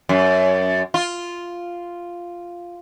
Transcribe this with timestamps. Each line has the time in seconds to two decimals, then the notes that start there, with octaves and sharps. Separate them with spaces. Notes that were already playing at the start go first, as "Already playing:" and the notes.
0.09 F#2
0.94 F4